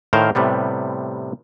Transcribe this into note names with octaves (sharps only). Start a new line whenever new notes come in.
A2 D#3 A#4 C5 F5
A2 C3 G3 B3